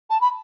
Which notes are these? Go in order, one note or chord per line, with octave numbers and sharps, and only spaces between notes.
A5
B5